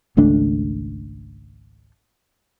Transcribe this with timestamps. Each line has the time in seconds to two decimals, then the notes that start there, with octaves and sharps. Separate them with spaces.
0.17 G#1 C#2 A3 D4